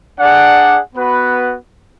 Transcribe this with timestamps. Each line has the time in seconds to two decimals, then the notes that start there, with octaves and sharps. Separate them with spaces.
0.19 D4 G#4 D5 F#5
0.95 B3 F#4 B4